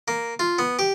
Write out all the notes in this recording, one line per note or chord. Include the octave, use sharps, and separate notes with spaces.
A#3
F4
B3
G4